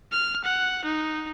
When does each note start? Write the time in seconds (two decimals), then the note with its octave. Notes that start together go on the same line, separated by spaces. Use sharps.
0.12 F6
0.44 F#5
0.84 D#4